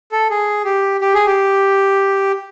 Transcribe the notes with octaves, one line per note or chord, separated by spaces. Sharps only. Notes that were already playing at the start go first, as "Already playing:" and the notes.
A4
G#4
G4
G4
G#4
G4